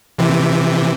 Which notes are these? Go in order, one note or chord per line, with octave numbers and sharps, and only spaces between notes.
C3 E3